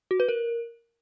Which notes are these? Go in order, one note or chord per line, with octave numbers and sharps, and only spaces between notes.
F#4
B4
A#4